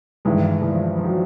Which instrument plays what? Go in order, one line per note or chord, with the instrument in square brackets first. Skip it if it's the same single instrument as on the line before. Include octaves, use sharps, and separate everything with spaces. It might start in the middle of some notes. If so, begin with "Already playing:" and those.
[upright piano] G2 D#3 G#3 [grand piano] E3
[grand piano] E3
F3
F3
F#3